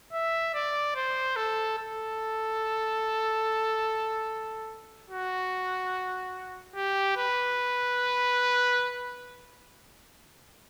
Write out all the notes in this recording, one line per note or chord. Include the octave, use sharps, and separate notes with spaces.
E5
D5
C5
A4
A4
F#4
G4
B4